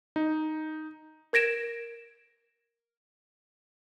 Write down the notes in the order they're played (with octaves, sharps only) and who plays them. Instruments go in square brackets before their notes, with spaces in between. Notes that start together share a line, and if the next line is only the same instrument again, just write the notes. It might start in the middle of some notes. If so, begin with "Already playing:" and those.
[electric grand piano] D#4
[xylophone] A#4 G#6 A#6 D7 E7